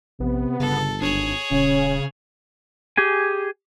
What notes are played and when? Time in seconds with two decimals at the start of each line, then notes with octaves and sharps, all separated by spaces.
0.20 A#1 C3 B3
0.60 G1 C#3 A4
1.02 G#1 D4 G#4 C#5
1.51 D#1 C#3 C#4
2.97 G4 G#4 G#5